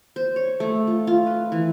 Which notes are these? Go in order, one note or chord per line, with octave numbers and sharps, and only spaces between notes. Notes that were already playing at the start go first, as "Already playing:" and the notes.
C5
C#5
A3
F4
F4
B4
E3